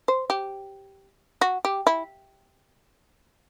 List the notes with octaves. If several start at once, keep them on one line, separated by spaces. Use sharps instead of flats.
C5
G4
F#4
G4
E4